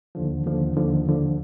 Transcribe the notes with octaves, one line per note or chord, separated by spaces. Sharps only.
D#2 D3 F3
D#2 D3 F3
D#2 D3 F3
D#2 D3 F3